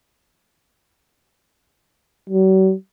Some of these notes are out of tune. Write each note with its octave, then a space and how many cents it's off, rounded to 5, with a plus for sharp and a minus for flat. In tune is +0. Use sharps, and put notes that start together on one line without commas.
F#3 +45